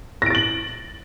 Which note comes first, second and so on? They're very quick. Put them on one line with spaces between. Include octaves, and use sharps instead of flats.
A#6 D7 A6 F#7